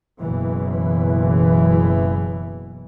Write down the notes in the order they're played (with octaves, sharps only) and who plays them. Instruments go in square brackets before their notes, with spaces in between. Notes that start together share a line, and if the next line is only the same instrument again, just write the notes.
[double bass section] F#1 B2 E3